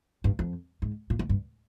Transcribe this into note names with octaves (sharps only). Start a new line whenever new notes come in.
G2
F2
G#2
A#2
G#2
G2